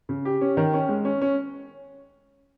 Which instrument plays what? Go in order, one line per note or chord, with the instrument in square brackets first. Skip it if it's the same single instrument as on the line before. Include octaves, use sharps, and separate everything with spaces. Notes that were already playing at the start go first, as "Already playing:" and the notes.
[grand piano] C#3
G4
C#4
D#3
C#4
G#3
C#4
C#4